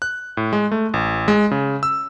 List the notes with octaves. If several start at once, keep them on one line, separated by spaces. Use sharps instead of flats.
F#6
A2
G#3
A3
A1
G#3
C#3
E6